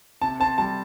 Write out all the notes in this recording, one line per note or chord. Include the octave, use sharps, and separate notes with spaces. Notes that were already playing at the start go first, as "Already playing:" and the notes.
C3 A5
C4 A5
G3 A5